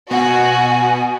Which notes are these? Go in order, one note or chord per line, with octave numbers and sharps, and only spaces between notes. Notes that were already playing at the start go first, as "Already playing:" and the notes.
B2 F#4 G#5